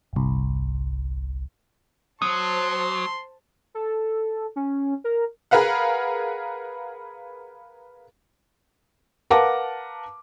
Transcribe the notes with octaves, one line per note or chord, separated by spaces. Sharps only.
G1 C2
F#3 C5 A5 C6 D#6
A4
C#4
A#4
G#4 A#4 B4 F5 F#5
A#4 B4 F5 F#5 A5 D6